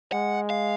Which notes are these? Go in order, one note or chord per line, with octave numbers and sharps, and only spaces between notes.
G#3 F#5
F5